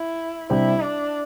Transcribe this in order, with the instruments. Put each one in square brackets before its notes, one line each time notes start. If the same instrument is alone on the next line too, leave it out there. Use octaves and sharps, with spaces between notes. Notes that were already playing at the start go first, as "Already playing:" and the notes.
Already playing: [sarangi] E4
[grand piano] C3 G3 D4 G4 C5 [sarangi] E4
[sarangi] D4